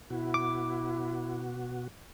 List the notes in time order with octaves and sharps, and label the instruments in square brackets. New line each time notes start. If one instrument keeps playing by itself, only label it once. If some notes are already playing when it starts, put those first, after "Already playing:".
[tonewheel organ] B2 F#4 [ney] E4
[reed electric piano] D6